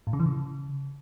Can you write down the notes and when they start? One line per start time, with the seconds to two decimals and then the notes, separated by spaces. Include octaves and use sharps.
0.07 A2
0.13 C#3
0.20 E3
0.26 C#3